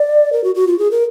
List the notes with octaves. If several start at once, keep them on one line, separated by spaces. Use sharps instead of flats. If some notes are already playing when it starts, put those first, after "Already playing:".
Already playing: D5
A#4
F#4
F#4
F4
G#4
A#4